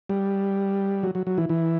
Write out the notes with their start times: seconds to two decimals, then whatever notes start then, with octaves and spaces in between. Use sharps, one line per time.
0.10 G3
1.03 F#3
1.15 F#3
1.27 F#3
1.38 E3
1.49 E3